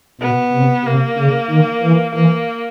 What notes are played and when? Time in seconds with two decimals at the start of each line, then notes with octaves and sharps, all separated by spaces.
0.21 B2 B3
0.53 C3
0.85 C3 A#3
1.18 C#3
1.50 D#3
1.83 E3
2.15 E3 A#3